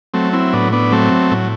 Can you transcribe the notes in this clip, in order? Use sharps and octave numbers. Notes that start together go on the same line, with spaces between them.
F#3 A3 C4
C4 E4
A2 B3 D4
B3 D4
F#3 A3 C4
A2